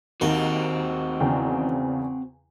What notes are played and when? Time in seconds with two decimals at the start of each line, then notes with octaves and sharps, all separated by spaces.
0.21 D#2 D#3 C4 F#4
1.20 E2 C#3 G5